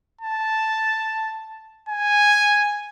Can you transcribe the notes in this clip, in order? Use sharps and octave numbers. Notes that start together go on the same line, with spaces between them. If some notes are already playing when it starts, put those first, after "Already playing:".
A5
G#5